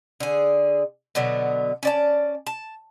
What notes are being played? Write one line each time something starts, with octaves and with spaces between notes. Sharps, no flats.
D3 G#4
B2 D3 F#3 B3
C#4 D5 A5
A5